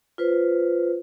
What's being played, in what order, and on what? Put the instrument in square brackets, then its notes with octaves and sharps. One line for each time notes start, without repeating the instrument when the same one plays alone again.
[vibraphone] F4 B4 C5